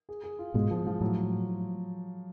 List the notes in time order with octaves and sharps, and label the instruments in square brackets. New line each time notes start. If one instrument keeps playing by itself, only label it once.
[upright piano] G#4
G#4
F4
[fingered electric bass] G#2 B2 [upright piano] G#3
[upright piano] F3
F3
[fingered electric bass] A2 [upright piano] F#3